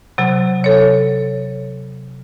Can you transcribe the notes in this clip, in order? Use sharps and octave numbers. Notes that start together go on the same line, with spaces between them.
C3 F#3
A4 C#5